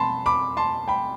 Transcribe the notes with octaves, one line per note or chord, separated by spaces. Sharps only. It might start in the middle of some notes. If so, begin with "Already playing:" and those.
Already playing: B2 A5 B5 C6
B5 D6
A5 C6
G5 B5